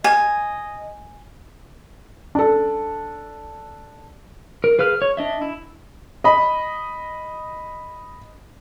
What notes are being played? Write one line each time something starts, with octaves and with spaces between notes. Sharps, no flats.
D#5 G#5
D4 A4
A#4
G#4 B4 F5 F6
C#5
D4 D#5 E5
E4
D#5 B5